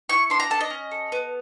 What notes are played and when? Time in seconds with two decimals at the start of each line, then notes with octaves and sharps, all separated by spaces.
0.09 E4 C#6
0.30 D4 C6
0.40 A#5
0.50 A4 A5
0.61 D#5
0.70 C#4
0.91 A4
1.12 B3